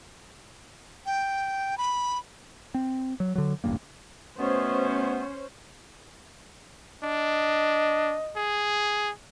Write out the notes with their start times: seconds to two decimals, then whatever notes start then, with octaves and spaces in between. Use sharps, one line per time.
1.06 G5
1.78 B5
2.74 C4
3.20 F#3
3.36 D3 F#3
3.64 E1 A1 G2 A#3
4.39 B2 A3 B3 C#4 C5
7.04 D4 D#5
8.36 G#4